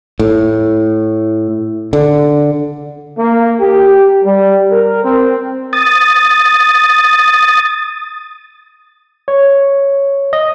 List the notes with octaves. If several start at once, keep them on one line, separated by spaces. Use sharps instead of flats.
A2
D3
A#3
G4
G3
A#4
C4
D#6 A6
C#5
D#5